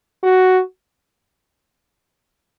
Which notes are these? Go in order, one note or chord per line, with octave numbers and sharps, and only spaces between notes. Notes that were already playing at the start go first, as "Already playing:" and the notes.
F#4